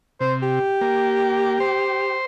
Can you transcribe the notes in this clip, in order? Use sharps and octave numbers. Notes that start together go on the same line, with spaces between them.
C3 C5
G4
A#3
C5